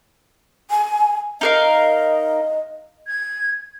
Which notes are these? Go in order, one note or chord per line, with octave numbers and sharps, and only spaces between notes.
G#5
D#4 A#4 D#5 F5
G#6